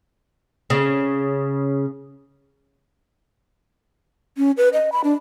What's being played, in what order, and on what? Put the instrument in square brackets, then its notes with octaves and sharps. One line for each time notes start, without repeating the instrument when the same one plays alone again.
[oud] C#3
[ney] C#4
B4
D#5
B5
D4